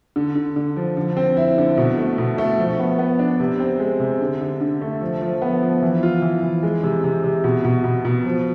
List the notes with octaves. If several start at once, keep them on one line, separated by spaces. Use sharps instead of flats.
D3
D3
D3
F3
D3
C4
E4
D3
B2
A3
B2
A3
F3
B3
B3
D4
C3
C4
G#3
C3
D3
D3
D3
A3
F3
F3
B3
F3
E3
F4
E3
E3
G#3
C3
C3
C3
B2
B2
B2
B2
F3